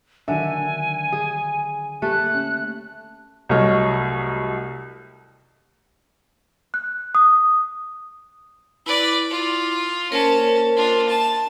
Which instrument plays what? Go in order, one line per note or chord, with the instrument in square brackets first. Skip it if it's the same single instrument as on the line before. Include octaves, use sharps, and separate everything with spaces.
[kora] D3 [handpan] D#3 F#3 E5 [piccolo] G#5
[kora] G#4
[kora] A3 B4 [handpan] A#3 G4 [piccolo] F#6
[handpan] C#4
[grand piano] C2 F#3 A3 C#5 D#5 F6
[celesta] F#6
D#6
[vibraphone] E4 D6 [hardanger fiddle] B4 D5
[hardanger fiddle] F4
[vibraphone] A#3 A#4 C5 [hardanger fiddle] C#4 A5
[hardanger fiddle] D4 F4
A5